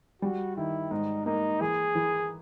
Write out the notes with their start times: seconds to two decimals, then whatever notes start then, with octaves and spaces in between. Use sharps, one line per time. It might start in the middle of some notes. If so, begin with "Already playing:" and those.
0.22 G3 F#4
0.57 D#3 E4
0.91 G#2 D#4
1.26 A#3 D#4
1.61 E3 G#4
1.95 E3